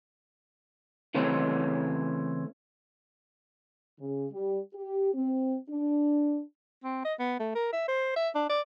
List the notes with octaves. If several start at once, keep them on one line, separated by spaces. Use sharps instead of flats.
C#3 E3 A3 C4 C#4
C#3
G3
G4
C4
D4
C4
D#5
B3
A3
A#4
E5
C5
E5
D4
D5